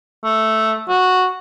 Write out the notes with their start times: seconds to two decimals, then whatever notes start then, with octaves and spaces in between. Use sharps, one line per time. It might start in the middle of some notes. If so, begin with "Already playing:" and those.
0.24 A3
0.89 F#4